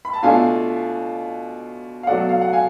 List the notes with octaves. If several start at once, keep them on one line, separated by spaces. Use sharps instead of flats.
B5
A5
B2 A3 D4 F4 F5 G#5
F5
B2 F#3 A3 D5 F#5
F5
F#5
F5 G#5